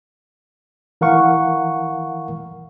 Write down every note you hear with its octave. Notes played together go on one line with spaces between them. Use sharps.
E3 A#4 F5 F#5 C#6